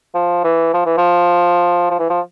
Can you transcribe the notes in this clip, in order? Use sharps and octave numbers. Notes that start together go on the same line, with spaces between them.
F3
E3
F3
E3
F3
F3
E3
F3